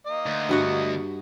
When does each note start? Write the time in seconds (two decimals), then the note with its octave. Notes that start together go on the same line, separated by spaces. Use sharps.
0.07 A#3 D#5
0.26 D2
0.49 G2 F#4 F#5